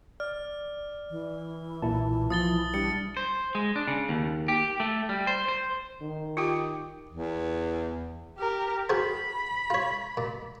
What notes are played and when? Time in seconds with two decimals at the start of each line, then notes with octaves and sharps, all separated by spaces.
0.20 D5 F6
1.10 E3
1.82 B1 A#2 E4 A5
2.30 F3 D#6 A6 G7
2.74 G3 D4 C#7
3.17 C5
3.55 G#3
3.76 D4
3.88 C#3
4.09 D#2
4.48 G4
4.80 A3
5.09 G3
5.27 C5
5.48 C5
6.01 D#3
6.37 F4 G4 G5 D6 D#6
7.09 E2
8.38 G4 A#4
8.89 F#4 G#4 C5 B5
9.70 F4 C#5
10.17 A#2